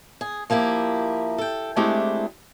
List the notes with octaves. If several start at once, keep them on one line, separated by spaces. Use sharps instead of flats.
G#4
F3 A#3 E4 G4
A4 G5
G#3 A3 C4 D4 E4 G4